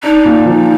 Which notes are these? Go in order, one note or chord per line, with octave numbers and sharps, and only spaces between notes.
D4 D#4
A#2
F3